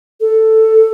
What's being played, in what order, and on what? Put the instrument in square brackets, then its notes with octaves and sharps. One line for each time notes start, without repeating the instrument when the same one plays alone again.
[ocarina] A4